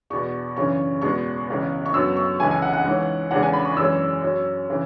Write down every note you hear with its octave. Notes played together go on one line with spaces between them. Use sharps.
E2 B2 B3 C#6
F#2 C#3 E3 C#4 C#6
E2 B2 G#3 B3 C#6
C#2 C#3 E3 B3
C#6
F#2 F#3 B3 E6
C#6
C#2 C#3 E3 G#5
G#5
F#5
F#5
G#2 E3 C#4
E2 C#3 E3 G#3 F#5
G#5
B5
C#6
F#2 E3 G#3 C#4 E6
F#2 F#3 C#4
C#3 E3